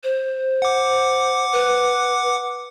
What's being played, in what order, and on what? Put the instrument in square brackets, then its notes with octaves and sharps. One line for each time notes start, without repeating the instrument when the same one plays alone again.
[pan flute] C5
[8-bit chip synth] F#5 D6
[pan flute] B4